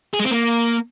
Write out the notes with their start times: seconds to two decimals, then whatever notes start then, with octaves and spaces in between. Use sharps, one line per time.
0.14 G#4
0.19 G#3
0.25 C4
0.31 A#3